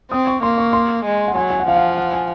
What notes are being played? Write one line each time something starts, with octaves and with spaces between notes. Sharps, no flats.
C4 D#6
C#6
A#3 C6
C#6
C6
G#3
F#5
F#3 G#5
G#5
F#5
F3 F5
F#5
F#5
G#5